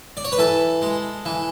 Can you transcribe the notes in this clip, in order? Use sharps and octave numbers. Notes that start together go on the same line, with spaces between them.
D5
C#5
B4
E3 A4
G#3
E3